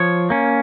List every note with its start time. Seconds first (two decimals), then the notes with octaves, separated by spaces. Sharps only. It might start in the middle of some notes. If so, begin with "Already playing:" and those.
Already playing: F3 C#5
0.30 A#3 C#4